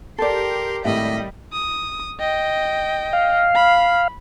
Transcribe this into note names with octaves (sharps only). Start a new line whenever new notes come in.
G4 A4 A#4 D5 C6
G#1 A2 G3 D#5 E5 B5
D#6
D#5 G5
F5
B5